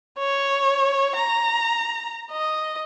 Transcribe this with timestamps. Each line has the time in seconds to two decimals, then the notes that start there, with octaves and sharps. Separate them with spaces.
0.19 C#5
1.16 A#5
2.32 D#5